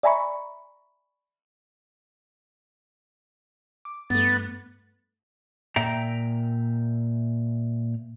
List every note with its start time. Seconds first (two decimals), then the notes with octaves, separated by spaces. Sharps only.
0.03 D5 E5 G#5 A#5 B5 C#6
3.85 D6
4.10 G2 A3 B3 A6
5.76 A#2 E5 G5 A#5